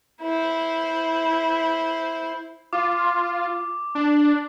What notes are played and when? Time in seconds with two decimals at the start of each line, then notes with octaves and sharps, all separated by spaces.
0.21 E4 C5
2.73 F4 D6
3.95 D4